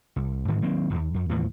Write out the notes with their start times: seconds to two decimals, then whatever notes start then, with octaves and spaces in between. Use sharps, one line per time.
0.16 C2
0.48 G#2 D#3 E3 G#3
0.62 D#3 F#3 A#3 C4
0.90 D1 D#2
1.14 F2
1.29 D#2 A2 E3 F3